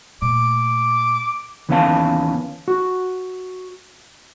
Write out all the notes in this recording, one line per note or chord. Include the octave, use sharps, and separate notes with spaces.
A#2 A3 D6
D#2 E3 B3 C#4 F5 A5
F#4